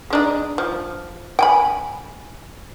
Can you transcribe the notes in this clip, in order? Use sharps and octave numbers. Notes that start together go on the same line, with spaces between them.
G#3 D4 D#4
F3
G5 G#5 B5